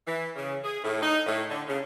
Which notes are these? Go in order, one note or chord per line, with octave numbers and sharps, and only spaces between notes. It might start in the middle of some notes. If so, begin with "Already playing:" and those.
E3
C#3
G#4
A2
D#4
A2
D3
C#3